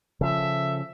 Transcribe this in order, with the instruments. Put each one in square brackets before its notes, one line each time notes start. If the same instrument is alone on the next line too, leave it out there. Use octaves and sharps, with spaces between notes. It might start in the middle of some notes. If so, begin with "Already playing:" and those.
[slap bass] C#3 F3 [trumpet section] A4 E5